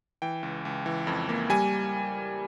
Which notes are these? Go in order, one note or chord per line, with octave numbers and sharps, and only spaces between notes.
E3 G5
C#2
C#2
E3
F2
A#3
G3 G#5